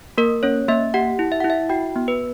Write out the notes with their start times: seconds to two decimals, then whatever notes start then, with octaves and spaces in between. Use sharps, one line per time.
0.18 A#3 A#4
0.43 C#4 C#5
0.68 A#3 E5
0.94 G4 F#5
1.19 E4
1.32 E5
1.40 F#5
1.44 E4
1.50 E5
1.69 F#4 G5
1.96 B3
2.08 B4